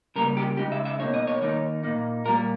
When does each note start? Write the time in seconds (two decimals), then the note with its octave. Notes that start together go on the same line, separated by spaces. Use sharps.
0.16 C#3 G3 A#3 A#4
0.37 G4
0.57 C#3 G#3 D#4 G4
0.72 E5
0.85 E5
0.99 B2 A#3 D#4 C#5
1.14 D#5
1.27 C#5
1.42 D#3 A#3 D#4
1.83 A#2 A#3 D#4
2.25 A#2 G3 A#3 A#4